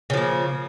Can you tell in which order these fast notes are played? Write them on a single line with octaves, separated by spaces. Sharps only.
C#3 F3 A#3